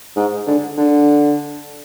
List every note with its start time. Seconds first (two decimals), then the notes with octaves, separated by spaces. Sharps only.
0.16 G#2
0.47 D3
0.77 D3